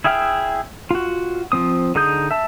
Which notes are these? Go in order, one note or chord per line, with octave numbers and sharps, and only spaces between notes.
E4 G#4 E5 G5 F6
F4 F#4
F3 C4 D#6
D3 D#4 G#4 D#6 G6
E5 A5